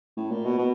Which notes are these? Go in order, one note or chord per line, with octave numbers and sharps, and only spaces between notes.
A2
A#2
B2
B2